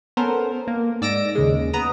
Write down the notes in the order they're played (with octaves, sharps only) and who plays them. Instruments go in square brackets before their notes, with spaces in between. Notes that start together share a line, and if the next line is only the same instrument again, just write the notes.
[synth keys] B3 C#4 A4 A#4 C5
A#3
G#2 D5 E6 A#6 D7
D#2 C#3 G#3
B3 A#5 D#6